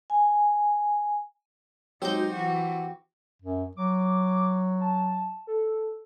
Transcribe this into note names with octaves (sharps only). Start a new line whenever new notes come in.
G#5
F#3 G#3 C4 D#4 G4 G6
E3 F#4
F#2
F#3 D6
A5
A4